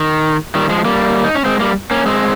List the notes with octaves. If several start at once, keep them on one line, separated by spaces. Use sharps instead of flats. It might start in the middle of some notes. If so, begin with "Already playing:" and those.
Already playing: D#3
D#3 G3
F3 G#3
G3 A#3
D#4
C#4
G#3 C4
G3 A#3
A#3 C#4
G#3 C4